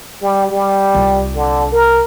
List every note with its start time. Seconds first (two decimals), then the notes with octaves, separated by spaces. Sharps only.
0.22 G3
0.50 G3
0.95 C2 F4
1.35 D3
1.72 A#4